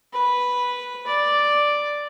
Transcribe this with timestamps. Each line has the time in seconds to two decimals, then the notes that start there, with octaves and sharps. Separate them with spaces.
0.13 B4
1.07 D5